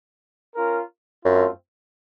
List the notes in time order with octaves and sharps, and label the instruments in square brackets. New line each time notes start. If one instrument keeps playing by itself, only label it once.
[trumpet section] C#4 F4 A#4
[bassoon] F#2 [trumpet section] A3 C4 F4